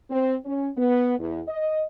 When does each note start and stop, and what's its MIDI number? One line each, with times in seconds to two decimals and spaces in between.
0.10 0.36 60
0.46 0.68 61
0.77 1.14 59
1.19 1.42 40
1.48 1.84 75